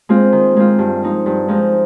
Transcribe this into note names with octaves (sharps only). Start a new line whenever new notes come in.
G#3 C4 F4
D#3
G#3 C4 F4
G2
F3 G#3 D#4
G2
F3 G#3 D#4